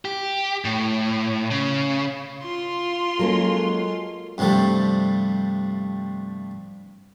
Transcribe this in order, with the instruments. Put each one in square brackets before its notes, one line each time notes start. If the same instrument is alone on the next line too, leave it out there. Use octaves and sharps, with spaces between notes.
[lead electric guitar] G4
A2
C#3
[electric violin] F4 C6
[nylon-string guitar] F#3 A#3 C#4 [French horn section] G#3 F#4 A4
[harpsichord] G2 C3 F3 G3 A3